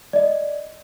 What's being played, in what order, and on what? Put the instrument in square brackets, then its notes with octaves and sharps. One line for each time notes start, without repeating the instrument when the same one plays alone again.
[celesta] D5 D#5